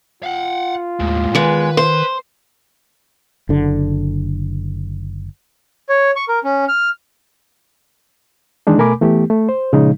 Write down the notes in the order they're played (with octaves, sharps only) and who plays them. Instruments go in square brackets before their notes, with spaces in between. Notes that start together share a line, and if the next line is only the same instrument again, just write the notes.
[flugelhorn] F4 [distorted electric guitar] F5 F#5
[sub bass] D#2 [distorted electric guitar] A2 G#3
[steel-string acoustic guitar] E2 G#3 [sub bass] D#3 [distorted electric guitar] B4
[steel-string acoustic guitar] C5
[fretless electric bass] F#1 D3
[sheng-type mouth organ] C#5
C#6
A#4
C#4
F6
[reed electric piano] D#3 E3 G#3 D4 D#4
B2 A3 A#4 G#5 B5 D6
E3 A3 B3 G4
A3
C5
A#2 C#3 F3 G#3 D#4